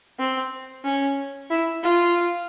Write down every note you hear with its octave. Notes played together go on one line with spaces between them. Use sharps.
C4
C#4
E4
F4